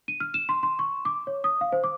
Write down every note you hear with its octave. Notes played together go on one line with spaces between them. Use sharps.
D#7
F6
E7
C6
C6
C#6
D6
C#5
D#6
F5
C5
D6